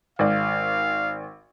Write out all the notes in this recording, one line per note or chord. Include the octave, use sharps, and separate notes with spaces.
G#1 D5 F5